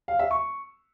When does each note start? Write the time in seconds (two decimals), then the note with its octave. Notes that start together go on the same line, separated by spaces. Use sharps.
0.08 F5
0.19 E5
0.31 C#6